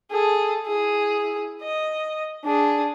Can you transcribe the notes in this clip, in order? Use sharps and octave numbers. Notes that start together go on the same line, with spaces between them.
G#4 A4
E4 G#4
D#5
D4 G#4